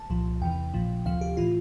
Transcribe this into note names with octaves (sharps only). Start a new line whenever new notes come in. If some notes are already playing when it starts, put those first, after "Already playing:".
Already playing: A5
C2 A#2 F3
E2 C3 E3 G5
A#1 A#2 F3
D2 C3 F3 F5
G4
A2 E3 F4